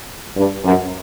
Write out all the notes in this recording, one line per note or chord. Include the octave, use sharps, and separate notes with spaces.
G2
F#2